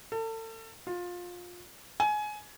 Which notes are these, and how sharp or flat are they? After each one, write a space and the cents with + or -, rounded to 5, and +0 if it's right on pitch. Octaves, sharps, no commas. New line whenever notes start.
A4 +35
F4 +20
G#5 +20